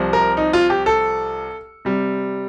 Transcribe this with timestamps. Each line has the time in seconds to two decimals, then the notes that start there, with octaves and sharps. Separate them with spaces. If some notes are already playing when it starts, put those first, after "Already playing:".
Already playing: C2 C3 F3
0.13 A#4
0.37 D#4
0.53 F4
0.70 G4
0.86 A4
1.85 C3 G3